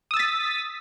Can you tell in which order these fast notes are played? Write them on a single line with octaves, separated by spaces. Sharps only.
D#6 E6 A6 B6